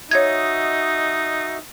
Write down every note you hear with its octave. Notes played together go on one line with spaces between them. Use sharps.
D#4 F#4 C#5 D#5 E5 G#6